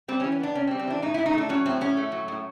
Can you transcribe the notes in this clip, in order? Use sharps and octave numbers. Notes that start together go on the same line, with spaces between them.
G3 C4
C#4
E3
C#4
B3 D4
C3 C#4
C4
G3
C4
E3 D4
A2 D#4
A2 E4
D#4
A3 D4
F#3 C#4
A2 C4
A2 C#4
A3
F#3
A2